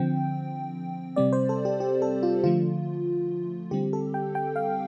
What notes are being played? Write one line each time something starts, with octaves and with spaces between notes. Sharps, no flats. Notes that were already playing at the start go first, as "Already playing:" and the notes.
Already playing: D3 F3 C4 G5
C3 G3 C4 D5
C5
A4
G4
G4
A4
F4
D3 F3 A3 F4
D3 G3 C4 G4
A4
G5
G5
F5